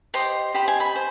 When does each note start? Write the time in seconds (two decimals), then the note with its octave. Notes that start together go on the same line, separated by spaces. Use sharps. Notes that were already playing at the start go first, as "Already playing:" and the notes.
0.14 G4 C5 D#5 C6
0.54 G4 C5 D#5 B5
0.68 G#5
0.80 B5
0.95 C5